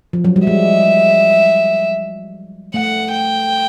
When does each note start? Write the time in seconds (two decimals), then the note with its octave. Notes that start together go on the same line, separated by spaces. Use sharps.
0.13 F3
0.24 F#3
0.36 G3
0.47 G#3 E5
2.74 A3 F#5
3.12 G5